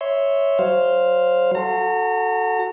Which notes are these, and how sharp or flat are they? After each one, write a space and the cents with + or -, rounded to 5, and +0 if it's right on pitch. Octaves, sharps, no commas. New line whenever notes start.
C#5 +0 E5 -10 C6 +0
F#3 +25 C5 +0 F5 +0
F#4 -10 A4 +0 A#5 -35